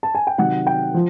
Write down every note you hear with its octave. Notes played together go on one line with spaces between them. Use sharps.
A5
G#5
G5
C3 D#3 F#3 F#5
G5
F3